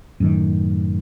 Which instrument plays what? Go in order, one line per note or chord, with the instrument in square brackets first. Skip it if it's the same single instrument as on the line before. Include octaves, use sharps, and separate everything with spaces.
[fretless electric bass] F#2 A2 D#3